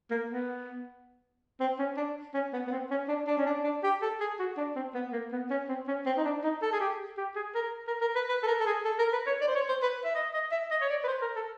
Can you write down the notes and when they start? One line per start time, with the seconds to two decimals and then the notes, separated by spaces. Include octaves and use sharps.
0.11 A#3
0.30 B3
1.60 C4
1.79 C#4
1.97 D4
2.34 C#4
2.53 B3
2.67 B3
2.72 C4
2.91 C#4
3.08 D4
3.27 D4
3.37 C#4
3.46 D4
3.64 D4
3.83 G4
4.02 A4
4.20 G#4
4.39 F#4
4.57 D4
4.76 C4
4.95 B3
5.13 A#3
5.32 B3
5.50 C#4
5.68 C4
5.88 C#4
6.06 C4
6.17 D#4
6.24 D4
6.44 D#4
6.62 A4
6.73 G#4
6.80 G4
7.17 G4
7.36 G#4
7.55 A#4
7.87 A#4
8.01 A#4
8.15 B4
8.29 B4
8.43 A4
8.47 A#4
8.60 A4
8.66 G#4
8.84 A4
8.99 A#4
9.13 B4
9.26 C#5
9.41 D5
9.48 C5
9.55 C#5
9.68 C5
9.82 B4
10.04 E5
10.15 D#5
10.34 D#5
10.51 E5
10.71 D#5
10.81 C#5
10.90 D5
11.04 B4
11.08 C5
11.22 A#4
11.36 A4